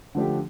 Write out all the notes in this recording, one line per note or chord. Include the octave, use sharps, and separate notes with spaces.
D3 F3 A3 D4 G4